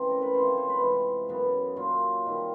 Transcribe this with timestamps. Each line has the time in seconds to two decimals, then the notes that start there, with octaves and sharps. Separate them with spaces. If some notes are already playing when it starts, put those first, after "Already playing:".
Already playing: C#3 E3 A3 C4
0.11 A#4
0.22 B4
0.34 C3 F3 A3 C4 C5
0.45 C#5
0.57 C5
0.69 B4
0.81 C3 E3 G#3
1.29 F#2 C#3 F#3 B3
1.76 A#2 F#3 A#3 F4
2.24 C3 D#3 G3